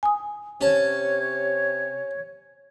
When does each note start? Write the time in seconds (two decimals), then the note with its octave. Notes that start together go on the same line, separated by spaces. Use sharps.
0.03 G#5 D#6
0.61 C3 C#4 C#5 A5